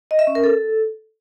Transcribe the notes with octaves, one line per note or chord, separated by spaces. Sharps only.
D#5
E5
C#4
A#4
A4